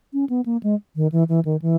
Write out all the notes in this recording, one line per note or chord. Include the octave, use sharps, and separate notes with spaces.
C#4
B3
A#3
G#3
D#3
E3
E3
D#3
E3